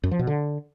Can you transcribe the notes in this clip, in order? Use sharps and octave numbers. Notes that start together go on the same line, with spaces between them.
F#2
F3
B2
D3